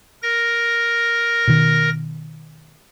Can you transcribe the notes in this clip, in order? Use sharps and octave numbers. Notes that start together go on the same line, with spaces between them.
A#4 A#6
B2 D#3